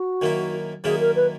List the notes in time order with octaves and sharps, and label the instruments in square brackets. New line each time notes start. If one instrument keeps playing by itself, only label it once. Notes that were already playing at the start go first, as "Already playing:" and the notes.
Already playing: [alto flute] F#4
[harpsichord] F#2 D#3 A#3 E4
[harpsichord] F#2 D#3 A#3 E4 [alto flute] G#4
[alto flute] A#4
B4